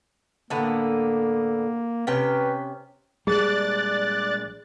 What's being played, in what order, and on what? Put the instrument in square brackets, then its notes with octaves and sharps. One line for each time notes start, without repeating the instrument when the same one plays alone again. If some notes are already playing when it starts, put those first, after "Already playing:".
[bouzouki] A2 D3 B3 [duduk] A#3
[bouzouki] C3 C#4 G5 [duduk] B4
[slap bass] A#1 G3 G#3 [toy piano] G#4 [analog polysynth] D5 F#6 A6